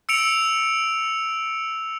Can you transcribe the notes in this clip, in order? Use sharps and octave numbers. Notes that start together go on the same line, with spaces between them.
E6 C#7 D7 F7